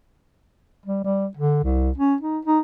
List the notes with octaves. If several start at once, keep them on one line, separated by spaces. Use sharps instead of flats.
G3
G3
D3
C2
C#4
D#4
D#4